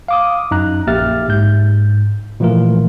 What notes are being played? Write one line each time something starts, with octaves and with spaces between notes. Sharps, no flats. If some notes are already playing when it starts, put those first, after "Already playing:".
F5 D6 D#6
F#2 D#4 A#5 F#6
A#1 A#3 G4 E5 F6 A6
G#2 G6
A#2 E3 F3 A3 F4 A#4